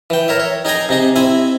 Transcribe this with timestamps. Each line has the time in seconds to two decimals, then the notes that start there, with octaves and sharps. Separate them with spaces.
0.10 E3 G5
0.28 A#4 C#5 E5
0.39 C#5
0.65 D#4 G#4 G5 G#5 A#5
0.89 C3 D#4 G#4
1.16 C4 E4 G#5